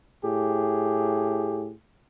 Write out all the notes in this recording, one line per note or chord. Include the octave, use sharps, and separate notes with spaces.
A2 G4 G#4